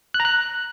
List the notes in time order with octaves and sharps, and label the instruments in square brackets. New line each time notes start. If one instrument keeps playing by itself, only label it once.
[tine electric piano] F#6
A#5
F#6